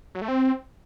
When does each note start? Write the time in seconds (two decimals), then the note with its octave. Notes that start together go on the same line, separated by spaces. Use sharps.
0.15 F#3
0.22 A3
0.28 C4